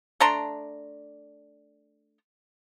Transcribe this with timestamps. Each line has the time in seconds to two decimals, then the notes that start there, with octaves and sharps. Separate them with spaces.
0.20 A3 D4 A#5 C6